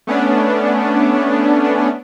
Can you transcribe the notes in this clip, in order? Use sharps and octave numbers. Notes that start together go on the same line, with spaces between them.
A3 B3 C#4 D4